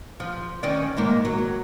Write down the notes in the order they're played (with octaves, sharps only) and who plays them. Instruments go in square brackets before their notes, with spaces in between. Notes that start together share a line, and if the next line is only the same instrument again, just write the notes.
[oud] F3
D#3 C#4 D5
G#2 D#3 A#3
F#3